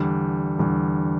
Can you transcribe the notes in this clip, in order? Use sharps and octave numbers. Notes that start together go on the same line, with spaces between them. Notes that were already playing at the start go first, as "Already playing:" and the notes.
Already playing: E2 D3 G3
E2 D3 G3